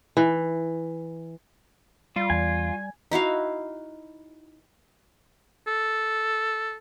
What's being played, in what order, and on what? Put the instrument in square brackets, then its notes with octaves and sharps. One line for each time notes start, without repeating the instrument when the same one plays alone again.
[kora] E3
[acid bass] G3 [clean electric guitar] F4
[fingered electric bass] E2 [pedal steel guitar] G#5
[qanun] D#4 E4 F#4 F5
[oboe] A4